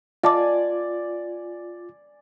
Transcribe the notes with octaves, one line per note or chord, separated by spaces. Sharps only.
F4 D5 D#5 G#5 A5 D6